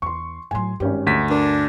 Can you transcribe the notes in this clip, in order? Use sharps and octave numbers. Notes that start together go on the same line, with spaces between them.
E2 C6 C#6
A2 F#3 G#5 C6
G#1 G2 C#4 G4
D2 B6
D4 A#4